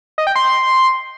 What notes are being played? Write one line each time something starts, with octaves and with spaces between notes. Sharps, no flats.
D#5
G5
C6